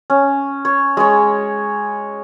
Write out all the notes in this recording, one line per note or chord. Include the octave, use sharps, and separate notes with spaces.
C#4
C#5
G#3 C#5